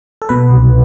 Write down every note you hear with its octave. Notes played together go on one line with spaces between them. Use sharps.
A4
B2 B4
C2